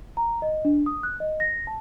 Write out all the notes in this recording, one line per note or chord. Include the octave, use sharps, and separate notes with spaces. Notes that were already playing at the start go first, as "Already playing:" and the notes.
A#5
D#5
D4
D#6
F#6
D#5
A#6
A5